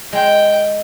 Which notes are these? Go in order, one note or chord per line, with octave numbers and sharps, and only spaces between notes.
G#3 G5